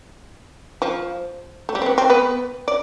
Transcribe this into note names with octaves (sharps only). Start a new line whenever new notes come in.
F3
A3
G3
C4
B3
C4
B3 B4
D5